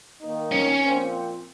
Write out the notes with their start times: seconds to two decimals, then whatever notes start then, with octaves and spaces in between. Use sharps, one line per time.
0.20 D#3 A#3 D#4
0.52 C#4
0.82 A#2 F3 C4